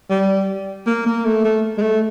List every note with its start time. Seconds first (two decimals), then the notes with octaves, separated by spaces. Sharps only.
0.10 G3
0.87 A#3
1.06 A#3
1.25 A3
1.45 A3
1.78 G#3
1.82 A3